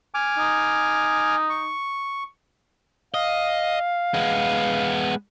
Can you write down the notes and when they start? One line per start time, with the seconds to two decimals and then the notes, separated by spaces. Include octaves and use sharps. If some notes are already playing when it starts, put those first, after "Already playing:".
0.14 G#5 D6 F6
0.38 D#4
1.50 C#6
3.14 D#5 F5
4.14 G#3 B3